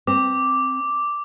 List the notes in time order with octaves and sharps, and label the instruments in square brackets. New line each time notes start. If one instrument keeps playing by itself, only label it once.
[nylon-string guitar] C4 [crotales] D6